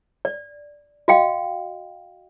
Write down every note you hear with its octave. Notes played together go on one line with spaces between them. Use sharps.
D5
F#4 D#5 F5 G5